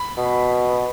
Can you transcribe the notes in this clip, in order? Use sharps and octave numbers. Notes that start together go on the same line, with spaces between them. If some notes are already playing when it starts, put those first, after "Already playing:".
Already playing: B5
B2